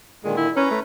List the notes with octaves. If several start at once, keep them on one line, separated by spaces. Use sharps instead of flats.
A#2 D3 D#3 G#3
E4
C#4 B4 C#5 A#5
A3